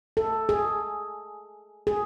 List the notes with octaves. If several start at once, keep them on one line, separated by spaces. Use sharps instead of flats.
A4
G#4
G#4